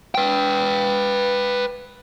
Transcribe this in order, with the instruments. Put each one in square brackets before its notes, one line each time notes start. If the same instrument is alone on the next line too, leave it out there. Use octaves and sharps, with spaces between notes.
[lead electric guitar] B4 G5